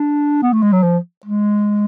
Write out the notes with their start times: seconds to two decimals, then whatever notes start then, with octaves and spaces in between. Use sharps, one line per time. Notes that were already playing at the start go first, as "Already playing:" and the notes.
Already playing: D4
0.42 B3
0.53 A3
0.63 G#3
0.73 F#3
0.83 F3
1.26 G#3